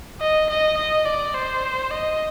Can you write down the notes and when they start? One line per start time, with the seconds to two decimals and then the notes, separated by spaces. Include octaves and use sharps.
0.21 D#5
0.49 D#5
0.77 D#5
1.06 D5
1.34 C5
1.91 D#5